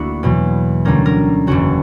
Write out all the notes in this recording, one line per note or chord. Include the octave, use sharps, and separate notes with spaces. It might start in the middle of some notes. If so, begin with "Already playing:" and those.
Already playing: D2 D3 A#3 D4 E4 F#4
E2 B2 F#3 B3
D2 D3 G3 A#3 C#4 A#4
A#4
F#1 E2 C#3 F#4